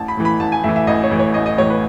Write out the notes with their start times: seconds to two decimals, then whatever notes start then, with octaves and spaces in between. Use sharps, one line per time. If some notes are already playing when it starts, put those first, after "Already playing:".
Already playing: A1 A5
0.08 B5
0.17 A2 E3
0.25 B5
0.40 A1 A5
0.52 G#5
0.64 A2 E3 E5
0.76 E5
0.87 A1 D#5
1.04 C#5
1.11 A2 E3
1.19 C#5
1.34 A1 D#5
1.46 D#5
1.58 A2 E3 C#5
1.70 B4